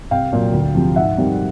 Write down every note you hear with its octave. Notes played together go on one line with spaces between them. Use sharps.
C2 F5 G5
A#2 F#3
D2
C3 F3
G#2 E5 F#5
D#3 G3 C4